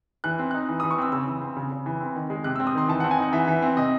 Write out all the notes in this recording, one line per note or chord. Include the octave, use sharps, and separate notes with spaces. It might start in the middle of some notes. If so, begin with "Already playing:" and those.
E3 F#6
C4
D#4 F#6
E3
D#6
E3
C#6
C4 E6
C#3 E6
E3
C4
C#3
C#3
E3
C4
D#3
G#3
C3 F#6
E6
C4
D#6
D#3 C6
E3 A5
F#5
C4
G#5
D#4 F#5
E3 E5
E3
C4
C3 D#5